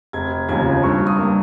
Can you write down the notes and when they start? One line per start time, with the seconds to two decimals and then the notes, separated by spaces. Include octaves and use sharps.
0.13 F1 G#6
0.48 D#2 C#3 F3 G#6
0.83 G2 C#6
1.07 D#6
1.18 G3 A#3